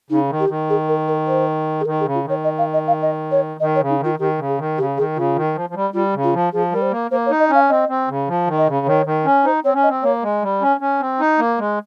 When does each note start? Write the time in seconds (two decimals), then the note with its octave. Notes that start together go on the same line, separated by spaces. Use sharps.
0.10 C#3 D#4
0.30 D#3
0.40 G4
0.49 D#3
0.70 G#4
0.89 A#4
1.08 A#4
1.27 C5
1.80 G#4
1.86 D#3 A#4
2.00 G#4
2.05 C#3
2.15 F4
2.24 D#3 C#5
2.44 D#5
2.58 F5
2.74 D#5
2.87 F5
3.02 D#5
3.31 C#5
3.60 D#3 D#5
3.75 C#5
3.81 C#3
3.89 D#4
4.00 D#3 F4
4.19 D#3 G4
4.39 C#3
4.48 G#4
4.58 D#3
4.78 C#3 G4
4.97 D#3 G#4
5.17 C#3 F4
5.36 D#3
5.55 F3
5.70 F3
5.75 G3
5.94 G3 F4
6.14 C#3
6.24 F4
6.33 F3
6.53 F3 G#4
6.72 G3 A#4
6.82 C5
6.91 A#3
7.11 A#3 C5
7.26 C#5
7.31 D#4
7.40 D#5
7.50 C#4 F5
7.69 C4 D#5
7.89 C4
8.08 C#3
8.28 F3
8.47 D#3
8.58 D#5
8.67 C#3
8.86 D#3 C#5
9.06 D#3
9.25 C#4
9.45 D#4 C5
9.65 C4 C#5
9.74 C#4
9.83 D#5
9.89 C4
10.03 A#3 C#5
10.23 G#3
10.43 G3
10.62 C#4
10.81 C#4
11.01 C4
11.20 D#4
11.39 A#3
11.59 G#3